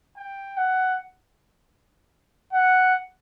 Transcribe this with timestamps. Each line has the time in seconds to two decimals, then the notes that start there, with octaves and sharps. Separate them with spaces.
0.17 G5
0.57 F#5
2.53 F#5